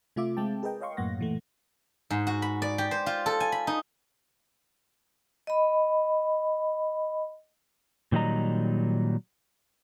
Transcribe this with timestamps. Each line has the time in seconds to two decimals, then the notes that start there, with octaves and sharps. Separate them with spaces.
0.16 C3 A3 F4 E5 D6
0.37 G#3 C4 G5 A5
0.63 G#4 A#4 B4 D#5 G5
0.81 C#5 D#5 F5 C6 C#6
0.97 F#2 A2 A#3 F#5 A#6
1.19 A#2 E3 A3
2.10 G#2
2.27 F#4
2.42 B5
2.62 D5
2.78 G4
2.91 C5
3.06 F4
3.26 A4
3.40 G#5
3.52 B5
3.67 D#4
5.47 D#5 B5
8.12 A#2 D#3 F#3 G3 D#5 A#5